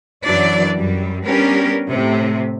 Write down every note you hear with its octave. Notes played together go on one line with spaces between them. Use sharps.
F#2 E3 F#3 D4 D5
F#2 G3
G3 B3 C#4 D4 G4 A#4
A2 C3